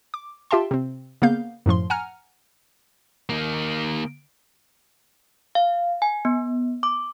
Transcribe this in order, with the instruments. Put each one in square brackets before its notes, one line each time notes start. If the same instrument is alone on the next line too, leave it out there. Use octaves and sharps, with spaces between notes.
[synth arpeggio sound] D6
F4 G4 E5 G5 A5 C6
C3 C4
C#3 A#3 B3 F5 G6
F#2 A2 F3 C6
F#5 G#5 A#5 F6
[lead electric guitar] D#3 A#3
[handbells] F5
G#5
B3
D6